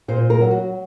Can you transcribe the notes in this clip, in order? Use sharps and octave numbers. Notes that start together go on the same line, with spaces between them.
A#2 C5
A#4
F#3
F#4